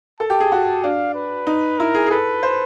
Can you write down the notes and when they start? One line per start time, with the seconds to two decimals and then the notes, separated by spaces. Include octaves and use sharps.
0.20 A4 A5
0.30 G4
0.40 G#4
0.52 F#4
0.84 D4 F5
1.15 B4
1.47 D#4
1.79 E4 A#4
1.94 G#4
2.07 G#4
2.11 A4 B4
2.43 C5